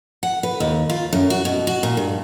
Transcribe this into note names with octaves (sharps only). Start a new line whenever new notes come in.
F#5
B4
D#2
F4
F#2
F#4
B2
F#4
A#2
G2